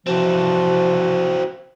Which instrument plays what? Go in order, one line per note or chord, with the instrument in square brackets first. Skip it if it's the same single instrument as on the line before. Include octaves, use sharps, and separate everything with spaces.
[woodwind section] C3 F3 [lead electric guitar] E3 C4 [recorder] F#4